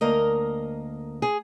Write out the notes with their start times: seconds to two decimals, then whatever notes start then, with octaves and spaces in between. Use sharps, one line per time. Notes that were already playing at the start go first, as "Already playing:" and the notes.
0.01 D2 A#3 A#4 D#5
1.22 G#4